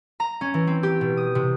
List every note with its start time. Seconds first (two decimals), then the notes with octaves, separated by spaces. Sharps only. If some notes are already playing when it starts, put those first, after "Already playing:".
0.20 A#5
0.41 C#4
0.54 E3
0.67 C4
0.83 G4
1.01 B2
1.17 D#6
1.35 C3